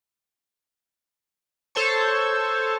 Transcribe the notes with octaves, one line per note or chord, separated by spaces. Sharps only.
A4 C5 C#5 A5 C#6